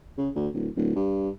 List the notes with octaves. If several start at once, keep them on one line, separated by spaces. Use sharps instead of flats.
C#3
D2
D1
D1
G2